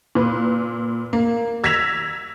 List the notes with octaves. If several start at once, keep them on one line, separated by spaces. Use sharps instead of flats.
A#2 B4
A#3
E6 G#6 A#6 B6 E7 F7